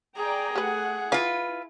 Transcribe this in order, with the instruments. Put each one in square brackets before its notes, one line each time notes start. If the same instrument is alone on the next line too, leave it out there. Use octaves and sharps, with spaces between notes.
[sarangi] G#4 [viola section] D5 G5 A#5
[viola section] A3 F#5 [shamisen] G4 B4
[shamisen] E3 F5 [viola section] E4 [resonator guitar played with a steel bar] F4 B4